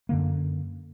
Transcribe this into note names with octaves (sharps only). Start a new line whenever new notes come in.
F#2 D3 A#3